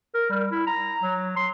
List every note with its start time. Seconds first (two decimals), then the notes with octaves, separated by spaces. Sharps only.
0.14 A#4
0.30 G3
0.52 E4
0.67 A#5
1.03 F#3
1.36 C6